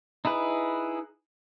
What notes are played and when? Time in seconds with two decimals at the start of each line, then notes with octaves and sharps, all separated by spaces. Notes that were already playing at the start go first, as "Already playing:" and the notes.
0.25 D#4 E4 G#4 B4